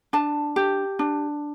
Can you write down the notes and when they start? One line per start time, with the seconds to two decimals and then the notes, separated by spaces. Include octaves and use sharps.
0.13 D4 A5
0.56 G4
0.99 D4